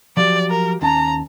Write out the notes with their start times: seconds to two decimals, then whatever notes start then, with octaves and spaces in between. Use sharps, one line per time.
0.17 F3 F#3 G4 D5
0.50 A#4
0.82 D#2 C#4 A5 A#5